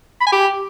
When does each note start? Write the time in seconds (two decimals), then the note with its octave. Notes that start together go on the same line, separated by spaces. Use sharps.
0.21 B5
0.27 G#5
0.32 G4